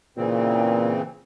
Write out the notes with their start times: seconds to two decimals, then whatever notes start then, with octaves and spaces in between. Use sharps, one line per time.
0.17 A#2 C#3 E3 C4